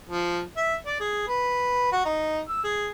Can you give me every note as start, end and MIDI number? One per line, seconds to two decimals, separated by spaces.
0.09 0.40 53
0.57 0.75 76
0.86 0.96 74
1.00 1.23 68
1.28 1.89 71
1.92 2.00 66
2.06 2.39 63
2.49 2.62 88
2.64 2.90 68